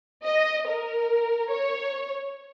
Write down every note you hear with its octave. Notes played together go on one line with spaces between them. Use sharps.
D#5
A#4
C#5